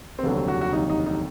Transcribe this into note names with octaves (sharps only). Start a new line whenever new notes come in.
C4
F1 D#2 D3 F#3 B3
C4
F#4
F#4
F1 D#2 D3 F#3 D#4
D#4
D#4